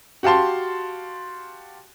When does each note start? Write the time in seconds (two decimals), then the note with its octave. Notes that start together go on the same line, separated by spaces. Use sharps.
0.23 F#4 G4 F5 A5 C6